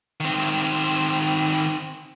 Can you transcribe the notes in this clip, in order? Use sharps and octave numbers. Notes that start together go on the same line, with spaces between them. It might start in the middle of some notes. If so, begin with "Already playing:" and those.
D#3 C4